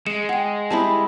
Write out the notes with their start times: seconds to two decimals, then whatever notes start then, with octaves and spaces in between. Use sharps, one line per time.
0.07 G#3 C#7 E7
0.29 G#4 F#5 G5
0.71 G3 C4 E4 A5 B5